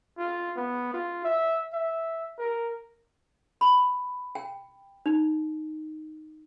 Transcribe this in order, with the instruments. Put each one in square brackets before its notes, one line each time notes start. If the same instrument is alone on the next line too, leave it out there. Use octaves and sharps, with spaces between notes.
[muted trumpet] F4
B3
F4
E5
E5
A#4
[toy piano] B5
G5
D#4